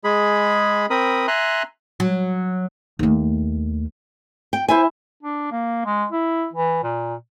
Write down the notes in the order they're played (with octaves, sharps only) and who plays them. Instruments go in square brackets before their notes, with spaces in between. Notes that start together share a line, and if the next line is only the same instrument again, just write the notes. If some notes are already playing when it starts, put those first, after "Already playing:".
[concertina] G#3 G#4 B5
C4 A#4 B5 D#6
E5 G#5 A#5 C6 F#6
[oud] F#3
[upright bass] D#2 A3
[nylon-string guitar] G5
[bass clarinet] E4 [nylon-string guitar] C5 E5 G#5
[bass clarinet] D4
A#3
G#3
E4
E3
A#2